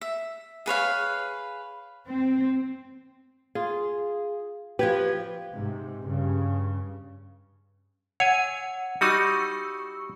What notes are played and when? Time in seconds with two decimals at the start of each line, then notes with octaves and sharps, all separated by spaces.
0.01 E5
0.66 G#4 B4 C#5 F5
2.07 C4
3.55 F4 G#4
4.79 F3 G4 B4 G#6
5.55 G#2 C3
6.03 G2 C#3
8.20 C#5 F#5 G#5
9.01 G3 D#4 F#4 C#6 E6 C#7